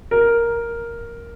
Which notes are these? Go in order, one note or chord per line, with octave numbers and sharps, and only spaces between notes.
A#4